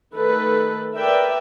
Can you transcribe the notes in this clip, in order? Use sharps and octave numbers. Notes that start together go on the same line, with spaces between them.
D#3 A3 A4 B4
A#4 B4 D5 E5 G5